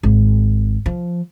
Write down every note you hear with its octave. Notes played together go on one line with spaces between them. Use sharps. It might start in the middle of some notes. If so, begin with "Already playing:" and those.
G#1
F3